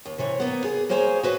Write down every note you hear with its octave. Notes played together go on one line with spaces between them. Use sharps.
D#2
C3 E3 C#5
A#3 B3
G#4
A#3 G#4 C5 C#5 G#5
F#4 B4 D#5